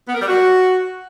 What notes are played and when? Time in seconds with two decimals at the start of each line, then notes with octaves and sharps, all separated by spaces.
0.08 B3
0.15 A#4
0.21 G3
0.28 F#4